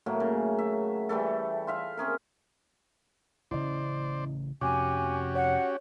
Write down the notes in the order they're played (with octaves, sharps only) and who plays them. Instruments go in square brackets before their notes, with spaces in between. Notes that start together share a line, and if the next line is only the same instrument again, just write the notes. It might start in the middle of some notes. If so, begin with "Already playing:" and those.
[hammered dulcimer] A2 F#3 A3 A#3
C#3
E5
E3 G3 A3 A4
F4 E5 F5
C4 C#4 G#4 A#4
[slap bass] A1 C#3 C#4 [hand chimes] E4 D#5 [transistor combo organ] C5 D5
[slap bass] F2 C3 [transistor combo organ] C#4 F#4 G4 [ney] G#5 [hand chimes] D6
[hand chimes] C#5 [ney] F#5